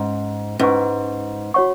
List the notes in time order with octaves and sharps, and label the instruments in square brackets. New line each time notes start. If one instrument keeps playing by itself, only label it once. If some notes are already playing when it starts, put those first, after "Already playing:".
Already playing: [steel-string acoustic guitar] G#2 [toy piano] C#4
[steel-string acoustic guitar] G#2 [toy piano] C#4 B4 G#5 C#6
[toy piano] F#4 C#5 F#5 C#6